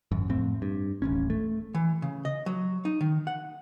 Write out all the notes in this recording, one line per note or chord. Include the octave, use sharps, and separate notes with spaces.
G#1 F#2
F2 A2 C4
G2
D#1 A1 C#4
A3
E3
C#3
D#5
F#3
D#4
D#3
F#5